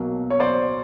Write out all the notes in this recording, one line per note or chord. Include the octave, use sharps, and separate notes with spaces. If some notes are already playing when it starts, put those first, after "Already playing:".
Already playing: B1 B2 F#3 A#3
C#5
C5 D5